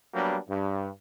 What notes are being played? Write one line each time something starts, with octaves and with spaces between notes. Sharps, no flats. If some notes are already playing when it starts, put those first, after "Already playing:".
F#3 G3 A#3 B3 D4
G2